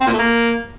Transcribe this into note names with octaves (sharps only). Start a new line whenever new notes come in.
C4
A#2
A3
A#3